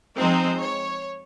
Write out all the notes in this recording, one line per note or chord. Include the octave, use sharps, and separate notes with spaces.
F3 G#3 C4 D#4 C5
C#5